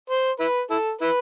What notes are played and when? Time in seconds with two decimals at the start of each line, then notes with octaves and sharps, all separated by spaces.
0.10 C5
0.40 E4 B4
0.70 E4 A4
1.01 E4 B4